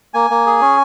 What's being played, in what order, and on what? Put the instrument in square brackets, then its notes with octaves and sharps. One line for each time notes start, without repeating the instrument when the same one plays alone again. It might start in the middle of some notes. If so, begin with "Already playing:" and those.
[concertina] A#3 G#5
A#3
G#4
C#4